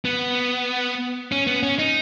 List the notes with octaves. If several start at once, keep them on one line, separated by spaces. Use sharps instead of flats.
B3
C#4
B3
C#4
D#4